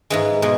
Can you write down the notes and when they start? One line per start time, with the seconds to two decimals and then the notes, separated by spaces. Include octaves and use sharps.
0.10 G#2 E3 G#3
0.42 B2 G#3